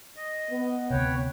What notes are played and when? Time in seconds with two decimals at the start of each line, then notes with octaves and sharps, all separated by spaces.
0.17 D#5
0.50 B3
0.90 D2 C3 B4 C#5 G5